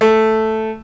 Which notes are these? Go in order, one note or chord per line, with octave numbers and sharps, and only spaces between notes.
A3